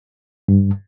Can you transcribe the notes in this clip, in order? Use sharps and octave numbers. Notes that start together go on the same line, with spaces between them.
G2